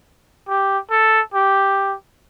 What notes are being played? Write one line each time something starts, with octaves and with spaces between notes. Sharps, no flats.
G4
A4
G4